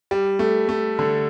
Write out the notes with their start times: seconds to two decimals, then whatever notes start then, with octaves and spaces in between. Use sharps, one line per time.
0.11 G3
0.39 A3
0.69 A3
0.99 D3